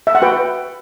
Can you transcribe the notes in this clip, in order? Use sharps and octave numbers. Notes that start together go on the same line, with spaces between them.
E5
F#5
F#4 B4 G5